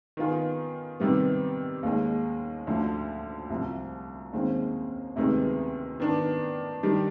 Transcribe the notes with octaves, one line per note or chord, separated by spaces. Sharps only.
D#3 B3 F4 G#4
C3 D#3 G3 B3
D#2 D#3 G#3
D2 D3 F3
C2 C3 F3
D#2 D#3 G#3 C4
D2 C3 D#3 G#3 B3
D#3 B3 D4
D#3 G3 D4 G4